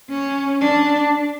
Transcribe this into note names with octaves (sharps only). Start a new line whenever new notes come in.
C#4
D4